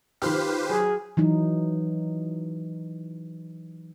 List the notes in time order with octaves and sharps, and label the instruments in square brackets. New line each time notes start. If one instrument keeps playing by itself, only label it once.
[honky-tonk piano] D#3 F4 F6 [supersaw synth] G4 B4 C5
[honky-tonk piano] F#3 [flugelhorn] G#4
[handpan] E3 F#3 D#4